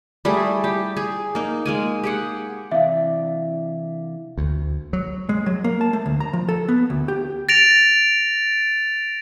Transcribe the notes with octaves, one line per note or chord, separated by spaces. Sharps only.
G3 A3 E4 G#4
G4
G#4
A#3 D#4
G#3 A#3 G#5
G4 G#4 F#5
C3 E3 D5 E5 F5
D2
F#3
G#3
F#3
A#3
A5
A3
D2
A#5
F3
A4
B3
D2
G4
A6 A#6 D7 F7